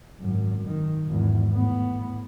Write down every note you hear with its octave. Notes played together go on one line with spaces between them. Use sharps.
G#1 F#2
D#3
G#1 E2
A2 B3